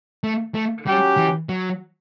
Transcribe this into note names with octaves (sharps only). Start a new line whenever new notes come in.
A3
A3
F#3 G3 C#4 G4
E3
F#3